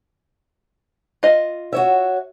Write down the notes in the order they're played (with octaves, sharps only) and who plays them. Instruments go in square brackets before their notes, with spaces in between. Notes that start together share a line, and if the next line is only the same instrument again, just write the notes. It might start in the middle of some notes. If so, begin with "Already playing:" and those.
[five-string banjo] F4 D#5
[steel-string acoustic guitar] F#4 C#5 E5